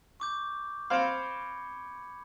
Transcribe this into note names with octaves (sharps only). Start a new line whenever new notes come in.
C#6 D6 G6
C4 C5 F5 B5 G#6 C#7